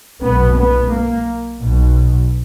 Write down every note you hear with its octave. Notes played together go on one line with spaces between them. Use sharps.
B1 B2 B3
B3
A#3
B1 B2